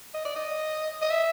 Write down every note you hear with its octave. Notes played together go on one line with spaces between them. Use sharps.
D#5
D5
D#5
D#5
E5